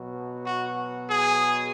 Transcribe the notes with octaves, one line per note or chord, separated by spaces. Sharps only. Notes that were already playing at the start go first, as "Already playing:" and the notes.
Already playing: B2 F#3
F#4
G#4